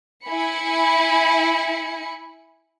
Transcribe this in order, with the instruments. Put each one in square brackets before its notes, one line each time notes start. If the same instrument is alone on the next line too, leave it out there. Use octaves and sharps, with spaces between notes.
[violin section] E4 G#5 B5 C#7